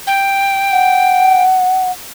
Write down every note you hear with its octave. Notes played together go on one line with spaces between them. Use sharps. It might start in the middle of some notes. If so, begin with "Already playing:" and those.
G5
F#5